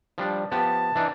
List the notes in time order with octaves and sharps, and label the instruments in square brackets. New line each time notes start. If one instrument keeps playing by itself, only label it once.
[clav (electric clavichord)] F3 G3 D4
[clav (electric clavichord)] F3 B3 G4 [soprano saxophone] A5
[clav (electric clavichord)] E3 D4 D#4